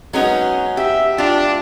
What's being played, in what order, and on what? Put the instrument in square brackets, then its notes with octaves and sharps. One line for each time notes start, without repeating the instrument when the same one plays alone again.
[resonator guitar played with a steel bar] F#3 C#4 D#4 [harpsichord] G#3 B3
[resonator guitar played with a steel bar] G4 [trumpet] E5
[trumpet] D4 [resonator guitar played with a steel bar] F4